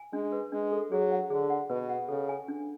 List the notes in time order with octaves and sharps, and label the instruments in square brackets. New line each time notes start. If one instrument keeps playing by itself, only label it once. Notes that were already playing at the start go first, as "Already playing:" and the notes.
Already playing: [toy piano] G#5
[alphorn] G#3 [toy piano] D4
[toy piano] B4
[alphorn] G#3 [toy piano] D4
[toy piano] A4
[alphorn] F#3 [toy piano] G#4
[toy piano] F#5
[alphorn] D3 [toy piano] G#4
[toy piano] F#5
[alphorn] B2 [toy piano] B4
[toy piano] F#5
[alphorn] C#3 [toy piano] A4
[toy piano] G#5
D4